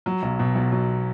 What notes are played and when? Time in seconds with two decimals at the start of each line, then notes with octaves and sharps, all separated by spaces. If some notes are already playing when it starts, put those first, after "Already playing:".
0.06 F#3
0.22 B1
0.39 B2
0.55 B1
0.72 F#3